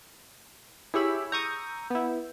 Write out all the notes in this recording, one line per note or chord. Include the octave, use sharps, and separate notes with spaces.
E4 G4 G#4 C#5 B5 E6
A#5 C#6 D#6 G6
B3 E4